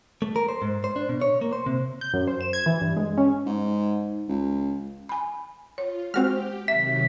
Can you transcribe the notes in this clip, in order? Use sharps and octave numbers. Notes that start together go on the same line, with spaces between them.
A3
A#4
C5
G#2
C5
D4
B2
C#5
A#3
C5
C3
G6
F#2
C5
E7
G#6
E3
G2
G#3
C#4
G#2
C#2
G#5 B5
F4 C#5
G#3 C4 F#4 G4 F6
C3 D#3 F#3 E5 B6